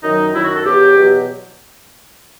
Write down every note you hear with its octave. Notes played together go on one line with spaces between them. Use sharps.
F#2 D#3 F#3 D#4
F#2 D#3 F#3 E4
F#4
A4
E2 B2 F#3 G4
E2 B2 F#3